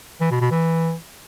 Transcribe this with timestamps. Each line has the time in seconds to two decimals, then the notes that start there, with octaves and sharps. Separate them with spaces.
0.21 E3
0.31 B2
0.41 B2
0.51 E3